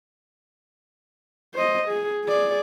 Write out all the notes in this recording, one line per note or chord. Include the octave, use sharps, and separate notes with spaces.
C5 D#5
G#4
G#4 D5